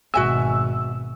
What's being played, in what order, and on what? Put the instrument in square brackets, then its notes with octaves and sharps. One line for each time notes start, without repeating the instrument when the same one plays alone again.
[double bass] G#1 B2 [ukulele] F#4 E5 G#5 [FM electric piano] E6